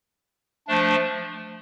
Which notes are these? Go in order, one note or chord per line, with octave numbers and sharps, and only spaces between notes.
F3 A3 D4